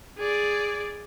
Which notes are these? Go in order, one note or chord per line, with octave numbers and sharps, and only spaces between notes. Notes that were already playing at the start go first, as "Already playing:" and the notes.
G#4 D5